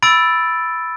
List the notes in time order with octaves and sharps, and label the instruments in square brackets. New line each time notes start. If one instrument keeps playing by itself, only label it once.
[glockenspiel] B5 E6 A6 D7